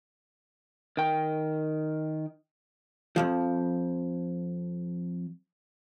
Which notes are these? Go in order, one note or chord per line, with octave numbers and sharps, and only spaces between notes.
D#3 G5
F2 G#2 F3